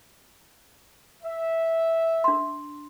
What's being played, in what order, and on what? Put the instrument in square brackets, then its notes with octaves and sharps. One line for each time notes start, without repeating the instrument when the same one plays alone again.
[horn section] E5
[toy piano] D4 C6